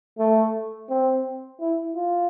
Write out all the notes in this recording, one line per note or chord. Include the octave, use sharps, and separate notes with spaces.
A3
C4
E4
F4